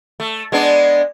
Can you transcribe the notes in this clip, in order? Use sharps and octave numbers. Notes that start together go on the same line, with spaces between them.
A3
G#3 B3 D4